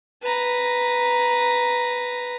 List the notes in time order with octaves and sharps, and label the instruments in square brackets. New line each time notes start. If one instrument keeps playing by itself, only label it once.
[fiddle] B4 A#5